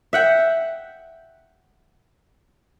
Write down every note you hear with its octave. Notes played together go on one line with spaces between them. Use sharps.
E5 F#5 G5